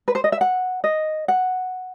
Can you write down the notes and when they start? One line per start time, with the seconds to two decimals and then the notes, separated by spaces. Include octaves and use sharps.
0.08 B4
0.15 C5
0.24 D#5
0.32 E5
0.41 F#5
0.84 D#5
1.28 F#5